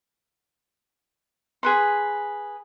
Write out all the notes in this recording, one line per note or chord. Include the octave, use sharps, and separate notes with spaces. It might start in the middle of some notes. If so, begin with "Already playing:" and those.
G#4 B4 C6